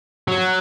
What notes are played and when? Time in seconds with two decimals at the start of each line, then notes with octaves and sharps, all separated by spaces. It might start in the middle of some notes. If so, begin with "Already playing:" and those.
0.28 F#3